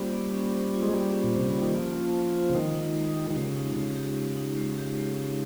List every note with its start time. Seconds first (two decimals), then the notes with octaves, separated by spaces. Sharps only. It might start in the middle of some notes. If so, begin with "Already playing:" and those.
Already playing: G3 A#3 C#4 F4 C5
0.13 A#3
0.33 C#4
0.54 C5
0.74 F4
0.83 G#3
0.93 G3 A#3
1.14 C#4
1.24 A#2
1.34 C3 C5
1.50 C#3 F4
1.62 D#3
1.74 F3 A#3
1.95 C#4
2.15 C5
2.35 F4
2.50 C#3
2.55 D#3 G#3
2.75 D#4
2.96 G#3
3.16 G4
3.31 D#3
3.36 C#3 G#3
3.57 D#4
3.76 C#3 G#3
3.96 G4
4.17 G#3
4.37 D#4
4.57 G#3
4.78 G4
4.98 G#3
5.17 D#4